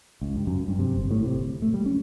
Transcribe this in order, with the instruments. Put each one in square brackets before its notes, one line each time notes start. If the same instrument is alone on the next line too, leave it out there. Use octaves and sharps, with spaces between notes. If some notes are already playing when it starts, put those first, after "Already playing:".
[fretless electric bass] C#2
G2
F#2
G2
C3
G1
A2
C3
D1
A3
G3
C#4